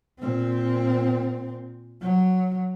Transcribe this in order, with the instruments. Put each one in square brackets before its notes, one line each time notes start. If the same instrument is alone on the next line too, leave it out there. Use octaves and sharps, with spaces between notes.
[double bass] A#2 C4
F#3